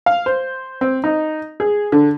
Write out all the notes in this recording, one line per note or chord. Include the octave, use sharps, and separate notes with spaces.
F5
C5
C4
D#4
G#4
D3